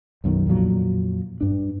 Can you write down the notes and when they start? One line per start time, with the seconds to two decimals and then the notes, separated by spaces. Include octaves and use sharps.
0.24 B1 F#2 B2 D#3
0.47 F2 A#2 F3 F#3
1.41 G2 D4